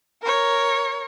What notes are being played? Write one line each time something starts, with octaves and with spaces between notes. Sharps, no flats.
A#4 C#5